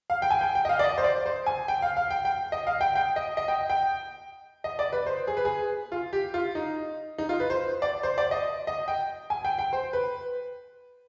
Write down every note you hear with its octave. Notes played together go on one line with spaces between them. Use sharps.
F5
G5
G#5
G5
G5
D#5
F5
D5
D#5
C5
D5
C5
G#5
G5
F5
F5
G5
G5
D#5
F5
G5
G5
D#5
D#5
G5
G5
D#5
D5
B4
C5
G#4
B4
G#4
F4
G4
F4
D#4
D#4
F4
B4
C5
D5
C5
D5
D#5
D#5
G5
G#5
G5
G5
C5
B4